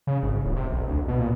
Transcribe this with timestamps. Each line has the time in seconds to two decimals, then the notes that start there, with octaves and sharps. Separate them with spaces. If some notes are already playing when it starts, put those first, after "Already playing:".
0.07 C#3
0.23 G#1
0.45 D1
0.56 C3
0.71 B1
0.88 D2
1.08 B2
1.20 A#2